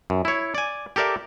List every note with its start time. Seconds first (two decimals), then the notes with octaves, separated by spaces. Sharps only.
0.10 F#2
0.25 E4 C#5
0.55 D5 G#5
0.96 G4 A4 A#4 D5 E5